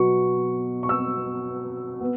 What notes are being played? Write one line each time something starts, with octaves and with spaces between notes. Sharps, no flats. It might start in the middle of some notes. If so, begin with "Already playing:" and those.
Already playing: B2 F#3 B3 C#6
C#6
E6
B3